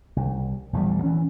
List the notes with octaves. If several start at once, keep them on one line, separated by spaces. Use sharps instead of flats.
C2
A#1 E2 A2 G3
E3 C#4